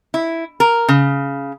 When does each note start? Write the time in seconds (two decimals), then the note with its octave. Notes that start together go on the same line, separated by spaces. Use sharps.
0.14 E4
0.60 A#4
0.89 C#3